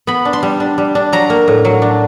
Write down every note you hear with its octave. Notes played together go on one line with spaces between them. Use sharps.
B3 B5
D4
C6
G3
D4
G3
D4
F#3 A#5
A#3
A2
F#3
D4